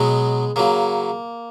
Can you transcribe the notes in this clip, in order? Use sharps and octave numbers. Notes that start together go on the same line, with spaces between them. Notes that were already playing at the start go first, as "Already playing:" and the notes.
Already playing: B2 F#3 G#3 B3
C#3 F#3 A#3